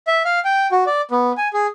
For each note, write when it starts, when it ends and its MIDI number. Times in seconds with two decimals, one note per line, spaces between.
0.07 0.23 76
0.25 0.39 77
0.45 0.67 79
0.72 0.84 66
0.86 1.01 74
1.11 1.32 59
1.37 1.48 80
1.53 1.67 68